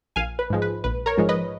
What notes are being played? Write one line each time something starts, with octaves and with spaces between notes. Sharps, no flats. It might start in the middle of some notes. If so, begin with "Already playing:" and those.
A#1 F5 G#5
B4
G#2 F3 G#3
B4
A#1 B4
A#4 C#5
G#2 F3 G#3
B4 D#5